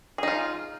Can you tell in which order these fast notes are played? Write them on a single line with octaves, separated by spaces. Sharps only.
G#4 D#4 F4